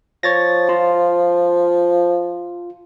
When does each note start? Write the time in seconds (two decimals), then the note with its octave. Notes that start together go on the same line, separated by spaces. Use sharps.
0.23 F3 C#5 A6 A#6
0.69 F4